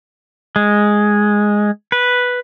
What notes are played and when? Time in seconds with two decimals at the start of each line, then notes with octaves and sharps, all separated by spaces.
0.56 G#3
1.92 B4